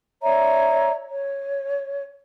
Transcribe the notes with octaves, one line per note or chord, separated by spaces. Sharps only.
C#5 D5 E5 A#5
C#5